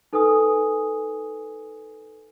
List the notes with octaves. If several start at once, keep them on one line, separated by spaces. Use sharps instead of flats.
D#4 A4 B4 G#5 D#6